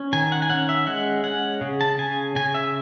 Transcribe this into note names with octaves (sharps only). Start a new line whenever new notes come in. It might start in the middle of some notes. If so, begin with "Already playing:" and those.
Already playing: C#4
D#3 G#5
F#5
G#5
C#4 F#5
E5
G#3 F#5
C#4 F#5
C#3
A5
C#3 G#5
C#3 G#5
E5